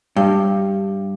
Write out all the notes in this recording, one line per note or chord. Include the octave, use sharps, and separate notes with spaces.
G2